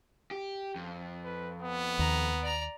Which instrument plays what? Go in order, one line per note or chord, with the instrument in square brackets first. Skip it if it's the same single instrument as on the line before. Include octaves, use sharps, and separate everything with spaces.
[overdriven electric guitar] G4
F2
[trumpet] B4
B3
[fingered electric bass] D#2 [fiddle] A#5
[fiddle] D5 A#5